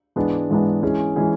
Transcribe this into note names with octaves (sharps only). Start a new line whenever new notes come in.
G#2 E3 G#3 B3 D4
G#2 E3 G#3 B3 D4
E3 G#3 C#4 G#4
E3 G#3 C#4 G#4